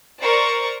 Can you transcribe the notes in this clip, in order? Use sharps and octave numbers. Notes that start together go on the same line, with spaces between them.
A#4 C5 D5 C#6